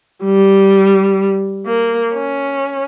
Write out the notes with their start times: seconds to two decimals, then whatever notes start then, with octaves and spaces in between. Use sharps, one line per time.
0.24 G3
1.66 A#3
2.14 C#4